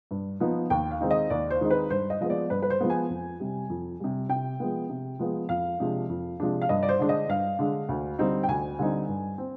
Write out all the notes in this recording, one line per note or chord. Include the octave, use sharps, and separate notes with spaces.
G2
F3 B3 D#4
D#2 G5
F5
D#3 G#3 C4 D#4
D#5
D#2 D5
C5
D#3 G#3 C4 D#4
B4
G2 C5
D#5
F3 G#3 B3 D#5
D5
G2 B4
B4
C5
F3 G#3 B3
G#5
F2
C3 G3
F2
C3 G3
C3 G5
F3 G#3 B3
C3
F3 G#3 B3
F2 F5
C3 F3 G#3 D4
F2
C3 F3 G#3 D4
F5
G2 D#5
D5
C5
D3 G#3 D4
D#5
G2 F5
D3 G#3 D4
D2
D3 G3 C4 D#4
G5
D2 G#5
D3 G3 C4 D#4
G2
C4